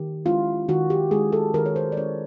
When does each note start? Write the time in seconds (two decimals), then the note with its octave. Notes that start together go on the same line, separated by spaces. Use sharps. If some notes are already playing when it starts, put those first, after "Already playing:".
Already playing: D#3 G4
0.25 G#3 C#4 E4 F4
0.68 D#3 F#4
0.90 G4
1.11 G#3 C#4 E4 G#4
1.32 A4
1.54 D#3 A#4
1.66 C#5
1.76 C5
1.92 D5
1.97 G#3 C#4 E4 C#5